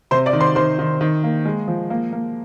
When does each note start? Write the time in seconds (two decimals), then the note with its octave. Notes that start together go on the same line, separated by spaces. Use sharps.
0.11 C3 C5 C6
0.26 D5 D6
0.33 D#3
0.41 C5 C6
0.55 D#3 C5 C6
0.79 D#3
1.01 D#3
1.24 A#3
1.45 G#3
1.68 F3
1.90 A#3
2.13 A#3